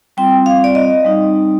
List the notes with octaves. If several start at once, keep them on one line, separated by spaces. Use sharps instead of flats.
G3 C4 F4 G5
F5
D5
D#5
G3 C4 D#4